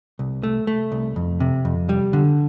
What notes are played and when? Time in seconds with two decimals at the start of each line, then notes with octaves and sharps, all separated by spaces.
0.19 C2
0.43 A3
0.67 A3
0.92 C2
1.16 F2
1.40 C3
1.65 F2
1.89 G3
2.13 D3